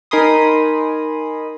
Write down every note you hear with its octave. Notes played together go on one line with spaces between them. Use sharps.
D#4 A#4 G#5 B5 C6 D#6